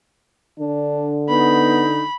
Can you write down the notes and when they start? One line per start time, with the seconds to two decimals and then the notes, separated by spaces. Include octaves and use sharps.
0.59 D3 D4
1.30 B3 D#4 B5